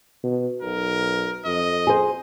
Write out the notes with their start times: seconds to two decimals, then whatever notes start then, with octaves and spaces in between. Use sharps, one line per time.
0.23 B2
0.62 B1 A#4
1.45 F2 D#5
1.87 G#4 C5